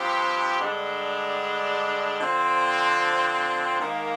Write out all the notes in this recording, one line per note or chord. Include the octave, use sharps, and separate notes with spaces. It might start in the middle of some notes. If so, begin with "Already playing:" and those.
Already playing: G2 F3 C4 G4 C5
G2 D3 G#3 D4
D3 F3 C4
G#2 D#3 A#3